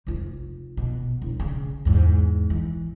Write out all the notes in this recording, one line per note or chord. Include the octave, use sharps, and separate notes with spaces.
F1 F4
B2
E1
C#3
E2 G#2
E3